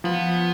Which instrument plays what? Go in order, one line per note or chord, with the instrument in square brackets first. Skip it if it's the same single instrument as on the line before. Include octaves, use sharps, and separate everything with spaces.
[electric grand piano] F3 [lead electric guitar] B3